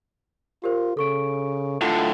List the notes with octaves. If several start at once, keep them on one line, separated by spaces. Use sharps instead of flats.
F4 G4 A#4 C5
C#3 A4 C#6 D7
A2 D3 F4